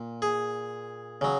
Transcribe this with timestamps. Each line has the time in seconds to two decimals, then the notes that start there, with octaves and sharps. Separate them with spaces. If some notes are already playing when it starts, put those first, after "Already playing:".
Already playing: A#2
0.22 G#4
1.21 C#3 F#3